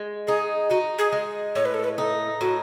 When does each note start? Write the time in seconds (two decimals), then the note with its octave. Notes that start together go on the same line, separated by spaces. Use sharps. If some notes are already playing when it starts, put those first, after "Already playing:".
Already playing: G#3
0.27 D#4 G#4
0.70 D#4 F#4
0.98 G#4
1.12 G#3
1.55 A2 C#5
1.65 B4
1.74 A4
1.84 B4
1.98 D#4 A4
2.41 A2 F#4